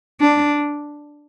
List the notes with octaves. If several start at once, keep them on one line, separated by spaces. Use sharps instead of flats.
D4